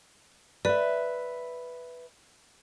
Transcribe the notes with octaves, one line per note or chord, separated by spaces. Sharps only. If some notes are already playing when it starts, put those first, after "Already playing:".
B4 D5 E5